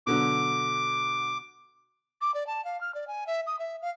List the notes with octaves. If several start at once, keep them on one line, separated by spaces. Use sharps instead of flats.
B2 D3 F#3 D6
D6
D5
A5
F5
F6
D5
G#5
E5
D#6
E5
F5